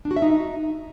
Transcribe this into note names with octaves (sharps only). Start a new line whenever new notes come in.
D4
F#4
E5
D#4